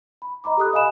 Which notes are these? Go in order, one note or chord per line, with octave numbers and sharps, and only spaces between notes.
B5
D#5 A#5 B5 D6
G4 A4 D#6 F#6
D#5 F5 G#5 B5 E7